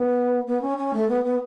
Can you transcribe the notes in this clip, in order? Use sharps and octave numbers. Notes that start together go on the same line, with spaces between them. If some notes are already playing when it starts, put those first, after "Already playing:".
Already playing: B3
B3
C#4
C#4
A3
B3
B3